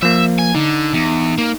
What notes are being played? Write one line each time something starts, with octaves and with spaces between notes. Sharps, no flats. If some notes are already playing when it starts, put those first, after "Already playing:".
F3 A#3 E5
G#5
D3 D#4
E2
A#3